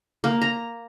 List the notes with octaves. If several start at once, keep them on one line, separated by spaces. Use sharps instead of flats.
A#3
A#5